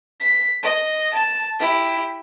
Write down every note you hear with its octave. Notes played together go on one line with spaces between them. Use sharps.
B6
D#5
A5
E4 G4